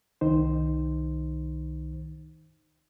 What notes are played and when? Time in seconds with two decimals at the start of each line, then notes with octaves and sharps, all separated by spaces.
0.21 C2 D#3 D#4 C5